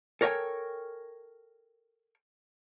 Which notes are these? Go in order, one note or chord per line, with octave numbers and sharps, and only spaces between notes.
A4 A#4 C#5 D#5 G5 G#5